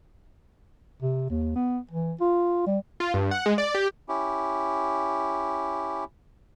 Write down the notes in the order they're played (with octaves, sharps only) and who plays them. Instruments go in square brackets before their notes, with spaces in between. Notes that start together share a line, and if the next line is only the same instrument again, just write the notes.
[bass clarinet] C3
D#2
B3
E3
F4
G3
[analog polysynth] F4
G2
F#5
G#3
D5
G4
[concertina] C#4 E4 G4